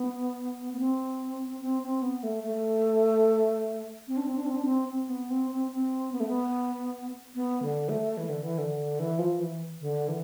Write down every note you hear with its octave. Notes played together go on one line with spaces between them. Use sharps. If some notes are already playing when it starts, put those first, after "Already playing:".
Already playing: B3
B3
C4
C4
C4
B3
A3
A3
C4
D4
C4
D4
C4
D4
C4
C4
B3
C4
C4
C4
B3
A3
B3
B3
D3
A3
E3
D3
E3
D3
E3
F3
E3
D3
E3